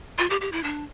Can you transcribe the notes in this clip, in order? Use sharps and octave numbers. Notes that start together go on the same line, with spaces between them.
F4
G4
G4
E4
D4